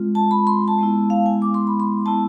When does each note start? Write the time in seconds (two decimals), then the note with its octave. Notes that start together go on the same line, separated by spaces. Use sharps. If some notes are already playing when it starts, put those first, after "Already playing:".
Already playing: G#3 C4 F4
0.15 A5
0.31 B5
0.47 C6
0.68 A5
0.79 G#3 B3 E4
1.10 F5
1.26 G#5
1.42 D6
1.54 C6
1.67 B5
1.80 C6
2.06 G#3 B3 E4 A5